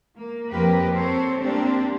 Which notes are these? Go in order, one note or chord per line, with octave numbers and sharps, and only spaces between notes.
A#3
F2 A#3 G4 A#4 B4
C4 A4 C5 C#5
A#3 C4 D4 G4